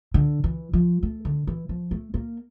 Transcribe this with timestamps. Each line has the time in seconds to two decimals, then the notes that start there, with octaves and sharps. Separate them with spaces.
0.14 D3
0.44 E3
0.73 F3
1.03 A3
1.25 D3
1.47 E3
1.69 F3
1.91 A3
2.14 A#3